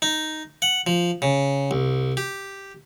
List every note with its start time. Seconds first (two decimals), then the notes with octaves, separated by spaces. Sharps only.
0.02 D#4
0.62 F#5
0.87 F3
1.22 C#3
1.71 C2
2.17 G4